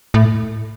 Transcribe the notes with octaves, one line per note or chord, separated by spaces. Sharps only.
A2